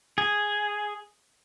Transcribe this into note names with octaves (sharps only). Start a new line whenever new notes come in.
G#4